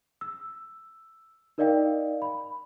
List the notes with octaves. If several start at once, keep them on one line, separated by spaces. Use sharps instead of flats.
E6
D#4 A#4 D5 D#5 F5 G5
B5